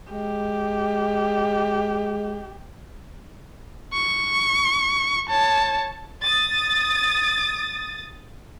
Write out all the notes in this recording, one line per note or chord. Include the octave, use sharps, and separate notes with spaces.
G#3 G4
C#6
C#5 A5
D#6 A6